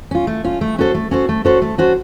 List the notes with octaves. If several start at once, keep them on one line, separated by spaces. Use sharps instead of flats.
C#4 F4
A3
C#4 F4
A3
C#4 F#4 A4 C5
A3
C#4 F#4 A4 C5
A3
C#4 F#4 A4 C5
A3
C#4 F#4 A4 C5